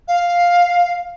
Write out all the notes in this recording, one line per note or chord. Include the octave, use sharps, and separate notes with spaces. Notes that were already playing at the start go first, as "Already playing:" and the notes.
F5